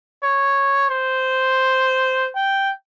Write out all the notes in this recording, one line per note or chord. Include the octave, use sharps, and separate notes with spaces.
C#5
C5
G5